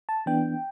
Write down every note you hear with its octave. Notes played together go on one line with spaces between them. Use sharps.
A5
E3 B3 D4 G5